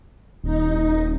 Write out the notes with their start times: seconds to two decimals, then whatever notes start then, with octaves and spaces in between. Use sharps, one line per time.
0.44 D#1 D#4